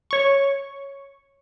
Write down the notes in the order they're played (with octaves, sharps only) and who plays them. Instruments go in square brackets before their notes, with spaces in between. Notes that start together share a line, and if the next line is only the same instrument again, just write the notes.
[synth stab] C#5 C#6